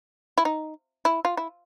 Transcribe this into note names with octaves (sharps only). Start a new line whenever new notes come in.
E4
D#4
E4
F4
E4